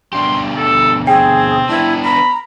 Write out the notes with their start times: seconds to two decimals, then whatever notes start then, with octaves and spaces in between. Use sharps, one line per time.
0.13 B2 D4 G4 C6
0.57 A4
1.07 C4 G#4 G5
1.69 B3 D4 E4
2.04 A#5 B5